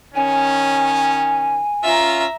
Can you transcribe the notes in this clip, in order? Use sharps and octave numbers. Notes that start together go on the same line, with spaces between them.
D#3 C#4 G#5
C#4 F4 E5 A#5